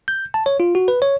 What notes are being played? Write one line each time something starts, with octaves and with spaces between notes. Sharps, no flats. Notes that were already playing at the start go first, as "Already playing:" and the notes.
G6
A5
C#5
F4
F#4
B4
C#5